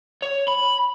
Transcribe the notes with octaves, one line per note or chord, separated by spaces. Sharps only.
C#5
B5